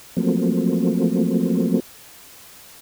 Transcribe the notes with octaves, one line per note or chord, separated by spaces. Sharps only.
F3 F#3 A3 A#3 C4